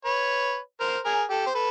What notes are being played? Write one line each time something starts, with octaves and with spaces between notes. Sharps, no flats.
B4 C#5
A#4 C5
G#4 A#4
G4 A4
C5
A4 B4